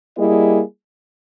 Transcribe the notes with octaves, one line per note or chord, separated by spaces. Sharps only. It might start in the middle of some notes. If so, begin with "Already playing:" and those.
G3 A#3 E4 G#4 D#5